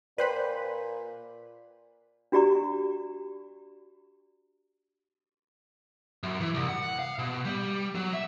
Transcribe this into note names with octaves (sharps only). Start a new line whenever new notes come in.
A#2 B4 C5 D5 G5 B5
D4 F#4 G4 D5 A#5 C#6
F#2
E3
C2
F#5
F5
B2
G3
F#3
E5